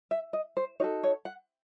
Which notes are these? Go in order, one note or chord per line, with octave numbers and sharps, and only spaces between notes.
E5
D#5
C5
D#4 F#4 A4 C#5
C#5
F#5